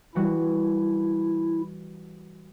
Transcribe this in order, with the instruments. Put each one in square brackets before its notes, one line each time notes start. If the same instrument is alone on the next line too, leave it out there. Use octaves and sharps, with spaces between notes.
[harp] E3 G3 F#4 [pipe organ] E4